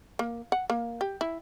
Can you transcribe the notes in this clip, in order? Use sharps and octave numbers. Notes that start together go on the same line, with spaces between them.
A#3
F#5
A#3
G4
E4